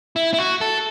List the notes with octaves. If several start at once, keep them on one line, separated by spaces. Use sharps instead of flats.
E4
E4
F#4
A4